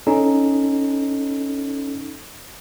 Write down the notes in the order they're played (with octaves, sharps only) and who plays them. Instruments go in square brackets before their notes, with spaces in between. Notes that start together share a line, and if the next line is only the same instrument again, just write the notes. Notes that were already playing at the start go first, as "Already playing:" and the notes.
[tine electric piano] C#4 D#4 A4